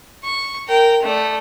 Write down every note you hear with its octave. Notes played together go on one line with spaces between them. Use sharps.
C#6
A#4 G5
A3 D5